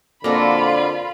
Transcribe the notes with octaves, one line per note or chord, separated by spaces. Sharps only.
F2 A#2 D3 A#3 F4 F#4 A4 B5